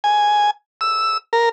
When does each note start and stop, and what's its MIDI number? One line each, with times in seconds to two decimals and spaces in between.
0.04 0.50 80
0.81 1.18 88
1.33 1.49 70